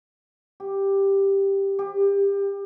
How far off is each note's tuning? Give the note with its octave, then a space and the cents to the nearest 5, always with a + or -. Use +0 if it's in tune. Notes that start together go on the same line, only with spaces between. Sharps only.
G4 +5
G4 +25